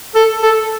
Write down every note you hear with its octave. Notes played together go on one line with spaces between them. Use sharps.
A4
A4